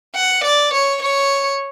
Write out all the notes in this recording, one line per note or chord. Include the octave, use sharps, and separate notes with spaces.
F#5
D5
C#5
C#5